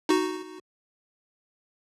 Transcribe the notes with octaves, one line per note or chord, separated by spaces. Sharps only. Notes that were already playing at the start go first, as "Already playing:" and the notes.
D#4 F#4